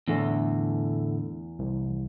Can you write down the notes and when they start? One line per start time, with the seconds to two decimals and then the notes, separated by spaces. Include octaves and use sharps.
0.07 E2 A2 D3 A3
1.59 C2